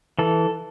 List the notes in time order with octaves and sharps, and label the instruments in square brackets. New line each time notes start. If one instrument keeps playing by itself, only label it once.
[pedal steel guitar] E3 A4